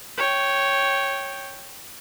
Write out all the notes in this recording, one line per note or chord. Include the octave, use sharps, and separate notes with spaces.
C#5 G5